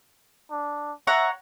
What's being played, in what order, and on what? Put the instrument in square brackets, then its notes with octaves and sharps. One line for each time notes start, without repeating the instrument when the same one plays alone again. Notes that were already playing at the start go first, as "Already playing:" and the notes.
[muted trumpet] D4
[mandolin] C#5 F#5 A#5 [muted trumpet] E5